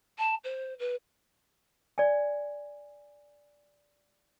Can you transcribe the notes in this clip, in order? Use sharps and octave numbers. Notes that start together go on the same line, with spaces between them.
A5
C5
B4
D5 G#5